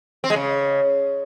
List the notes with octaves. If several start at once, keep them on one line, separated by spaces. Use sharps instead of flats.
C4
G#3
C#3